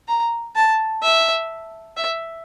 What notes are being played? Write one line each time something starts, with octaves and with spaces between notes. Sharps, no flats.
A#5
A5
E5
E5